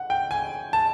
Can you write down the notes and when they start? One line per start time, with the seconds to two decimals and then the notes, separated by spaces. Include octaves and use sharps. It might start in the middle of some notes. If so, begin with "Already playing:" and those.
Already playing: F#5
0.10 G5
0.31 G#5
0.73 A5